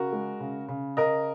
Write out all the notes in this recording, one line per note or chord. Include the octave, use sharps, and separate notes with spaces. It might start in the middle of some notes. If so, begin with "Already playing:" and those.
Already playing: C#3 F#4 A#4
G#3
C#3
C#3
C#3 A#4 D#5